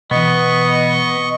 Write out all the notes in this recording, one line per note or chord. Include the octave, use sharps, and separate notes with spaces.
B2 E3 B3 D#5 C#6